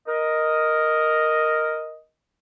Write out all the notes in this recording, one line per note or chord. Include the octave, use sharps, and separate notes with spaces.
A#4 D#5